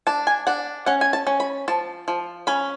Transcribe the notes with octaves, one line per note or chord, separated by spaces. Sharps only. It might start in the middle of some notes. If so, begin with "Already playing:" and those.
D4 A5
G#5
D4 F#5
C#4 F#5
G#5
A5
C#4
B5
F3 A5
F3
C#4 B5